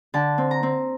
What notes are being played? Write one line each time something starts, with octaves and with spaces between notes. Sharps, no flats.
D3 A5
C4
A#5
C4